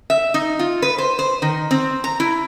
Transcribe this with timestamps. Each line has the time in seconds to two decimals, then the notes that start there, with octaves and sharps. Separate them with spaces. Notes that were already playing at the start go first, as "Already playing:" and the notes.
0.10 E5
0.34 D#4
0.59 F4
0.82 B4
0.98 C5
1.19 C5
1.42 D#3
1.71 C4
2.04 A#5
2.20 E4